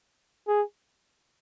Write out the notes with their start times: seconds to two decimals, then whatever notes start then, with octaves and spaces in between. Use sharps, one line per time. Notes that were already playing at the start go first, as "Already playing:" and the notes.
0.48 G#4